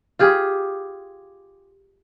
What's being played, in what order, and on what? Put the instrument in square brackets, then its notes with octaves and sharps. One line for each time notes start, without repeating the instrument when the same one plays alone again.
[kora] F4 G4 G#4